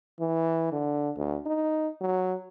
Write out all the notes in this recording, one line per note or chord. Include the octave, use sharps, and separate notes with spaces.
E3
D3
D2
D#4
F#3